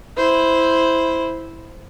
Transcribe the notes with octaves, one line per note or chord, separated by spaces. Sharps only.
E4 C5